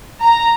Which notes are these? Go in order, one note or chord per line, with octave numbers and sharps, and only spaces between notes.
A#5